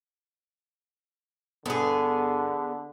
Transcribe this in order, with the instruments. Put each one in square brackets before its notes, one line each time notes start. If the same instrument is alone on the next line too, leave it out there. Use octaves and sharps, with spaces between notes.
[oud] G2 A4 [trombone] D3 [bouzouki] B3 G#4